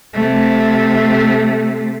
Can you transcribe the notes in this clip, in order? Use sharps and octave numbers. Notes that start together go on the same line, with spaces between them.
C3 A3